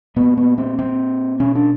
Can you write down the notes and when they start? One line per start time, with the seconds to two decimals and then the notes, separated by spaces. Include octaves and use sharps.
0.16 A#2 B3
0.37 B3
0.58 C4
0.79 C4
1.40 B2 C#4
1.55 D4